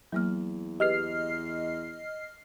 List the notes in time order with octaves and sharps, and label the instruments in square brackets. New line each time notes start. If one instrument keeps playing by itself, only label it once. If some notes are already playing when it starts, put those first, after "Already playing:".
[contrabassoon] E2 [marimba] F#3 A#3 F6
[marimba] G4 G#4 B4 [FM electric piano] D#5 F6 C7